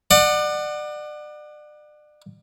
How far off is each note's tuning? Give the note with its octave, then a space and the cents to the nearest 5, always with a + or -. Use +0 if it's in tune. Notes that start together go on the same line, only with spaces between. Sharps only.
D5 +35 F#5 +0